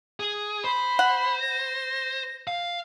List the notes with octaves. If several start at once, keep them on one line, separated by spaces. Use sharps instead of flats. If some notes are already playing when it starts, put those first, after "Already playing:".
G#4
C5 B5
F#5
A#6
F5